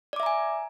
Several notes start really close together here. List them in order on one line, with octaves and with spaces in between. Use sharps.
D5 D6 E5 A#5 G#5